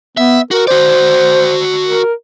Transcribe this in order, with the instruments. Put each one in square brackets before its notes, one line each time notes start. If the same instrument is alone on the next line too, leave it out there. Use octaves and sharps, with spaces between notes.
[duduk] B3 [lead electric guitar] E5
[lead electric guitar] F#4 [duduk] A#4
[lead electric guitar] F#4 D5 [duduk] C5
[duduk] A#4